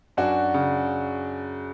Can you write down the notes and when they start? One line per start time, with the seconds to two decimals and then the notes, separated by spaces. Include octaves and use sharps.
0.17 F#2 D4 F#4
0.54 C#3